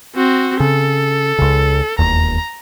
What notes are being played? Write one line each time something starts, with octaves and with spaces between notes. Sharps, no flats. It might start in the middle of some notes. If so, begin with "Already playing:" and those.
C4 F#4
C#3 A4
C#2 C#3
E1 D#2 A#5